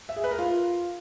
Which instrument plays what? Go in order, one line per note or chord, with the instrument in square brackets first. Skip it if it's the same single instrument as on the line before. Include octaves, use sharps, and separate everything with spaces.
[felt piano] E5
G#4
B4
A#4
F4